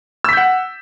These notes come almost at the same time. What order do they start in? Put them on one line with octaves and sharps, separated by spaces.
E6 B6 G6 F#5